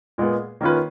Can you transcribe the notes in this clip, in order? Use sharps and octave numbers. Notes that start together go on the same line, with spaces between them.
A#2 G#3 B3
D#3 A#3 C#4 F4 B4